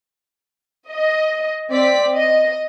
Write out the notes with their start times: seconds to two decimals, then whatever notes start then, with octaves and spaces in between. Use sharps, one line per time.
0.89 D#5
1.70 C4 D5 B6
2.15 D#5